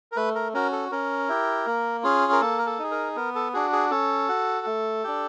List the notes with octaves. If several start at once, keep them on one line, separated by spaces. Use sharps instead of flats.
A#4
A3 B4
A#4
C#4 F#4 A#4
A4
C#4 A#4
E4 G4
A#3
C#4 F4 G#4
A#4
A#3 A4
A#4
A4
D#4 G#4
A#4
B3 A#4
A4
D4 F#4 G#4
G#4
C#4 A4
F#4
A3
D4 G4